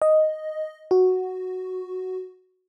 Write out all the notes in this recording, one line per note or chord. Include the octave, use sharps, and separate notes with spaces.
D#5
F#4